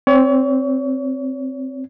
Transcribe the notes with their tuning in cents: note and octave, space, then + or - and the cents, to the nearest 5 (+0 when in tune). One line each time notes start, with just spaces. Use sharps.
C4 +0 C#5 +40